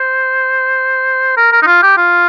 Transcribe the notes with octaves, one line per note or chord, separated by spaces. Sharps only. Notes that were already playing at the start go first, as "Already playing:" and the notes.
Already playing: C5
A#4
A#4
D#4
F4
G4
F4